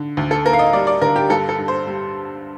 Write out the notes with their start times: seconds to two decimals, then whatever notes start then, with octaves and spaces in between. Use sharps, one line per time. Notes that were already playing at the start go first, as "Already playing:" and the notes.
Already playing: D3
0.17 D2
0.31 A4
0.45 A#3 A#4
0.53 F5
0.59 D#5
0.73 G3 D5
0.87 D5
1.01 D3 A#4
1.16 G4
1.30 G2 A4
1.49 A4
1.58 G2
1.68 C5
1.87 G3